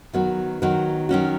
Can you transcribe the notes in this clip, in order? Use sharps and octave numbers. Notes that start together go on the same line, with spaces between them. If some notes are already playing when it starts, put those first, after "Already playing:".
D#3 F#3 B3 F#4
D#3 F#3 B3 F#4
D#3 F#3 C#4 F#4